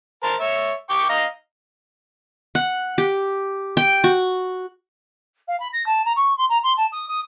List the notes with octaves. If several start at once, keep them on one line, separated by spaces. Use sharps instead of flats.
A#4 C5 A5
C#5 E5
G5 C#6 D6
D#5 F5 A#5
F#5
G4
G5
F#4
F5
B5
A#6
A5
A#5
C#6
C6
A#5
C6
A5
D#6
D#6